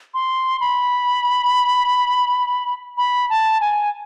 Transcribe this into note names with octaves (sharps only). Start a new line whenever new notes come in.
C6
B5
B5
A5
G#5